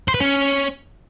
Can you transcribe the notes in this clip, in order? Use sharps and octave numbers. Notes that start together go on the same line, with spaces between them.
C5
B4
C#4